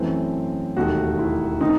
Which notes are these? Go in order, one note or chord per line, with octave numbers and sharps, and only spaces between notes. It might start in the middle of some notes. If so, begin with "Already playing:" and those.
Already playing: F#2 E3 A3 C4
E1 D#2 D#3 A3 F#4
E4
D#3 A3 C4 D#4